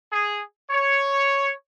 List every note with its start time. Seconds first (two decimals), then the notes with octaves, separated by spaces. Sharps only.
0.12 G#4
0.71 C#5